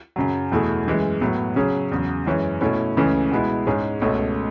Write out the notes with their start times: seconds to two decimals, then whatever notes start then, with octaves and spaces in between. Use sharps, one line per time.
0.16 F#2 C#3 F#3
0.52 E2 B2 A3 E4 G#4
0.86 F#2 E3 G#3
1.21 A2 F#3 B3
1.56 C#3 F#3 C#4 G#4
1.92 E2 C#3 F#3
2.26 F#2 E3 G#3 C#4
2.61 B2 A3 C#4 E4
2.97 C#2 C#3 E3 A3 C#4
3.32 B2 G#3 B3 E4
3.66 G#2 G#3 C#4 G#4
4.01 C#2 B2 A3 C#4